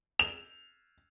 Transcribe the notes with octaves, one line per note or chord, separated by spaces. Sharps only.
F7